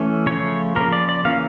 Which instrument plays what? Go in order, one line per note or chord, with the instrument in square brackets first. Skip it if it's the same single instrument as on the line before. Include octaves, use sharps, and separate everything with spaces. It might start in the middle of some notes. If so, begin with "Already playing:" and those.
Already playing: [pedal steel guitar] E3 A3 C#4
C#3 F3 A3 C#5
C#3 F3 A#3 A#4
D5
D5
C#3 E3 A#3 C#4 F5